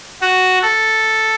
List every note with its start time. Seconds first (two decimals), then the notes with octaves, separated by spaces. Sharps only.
0.22 F#4
0.62 A4